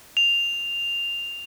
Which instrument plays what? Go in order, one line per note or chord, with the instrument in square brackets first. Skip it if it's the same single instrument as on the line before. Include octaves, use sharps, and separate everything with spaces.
[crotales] F7